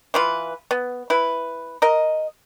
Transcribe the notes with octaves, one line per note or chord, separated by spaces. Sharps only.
E3 F4 B4
B3
E4 B4
A#4 D#5